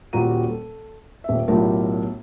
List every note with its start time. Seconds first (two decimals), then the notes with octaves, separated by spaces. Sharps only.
0.13 D#1 A#2 G3 F#4 A#5 D#7
0.50 A4
1.24 D#1 E5
1.48 B1 A2 D4 F4 G4 A#4